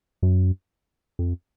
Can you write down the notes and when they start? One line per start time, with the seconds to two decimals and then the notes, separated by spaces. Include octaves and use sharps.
0.23 F#2
1.19 F2